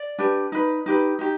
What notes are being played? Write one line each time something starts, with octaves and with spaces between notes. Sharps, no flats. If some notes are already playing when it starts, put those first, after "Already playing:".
Already playing: D5
D4 G4 B4
D#4 B4
D#4 G4 B4
D#4 G4